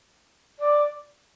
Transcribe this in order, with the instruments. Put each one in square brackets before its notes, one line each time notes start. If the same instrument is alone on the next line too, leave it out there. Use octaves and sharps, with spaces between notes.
[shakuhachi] D5